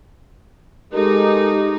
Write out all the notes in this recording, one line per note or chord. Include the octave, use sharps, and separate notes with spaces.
G#3 D#4 G4 A4 A#4